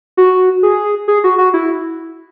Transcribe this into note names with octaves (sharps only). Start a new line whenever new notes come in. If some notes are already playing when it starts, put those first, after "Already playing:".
F#4
G#4
G#4
F#4
F#4
E4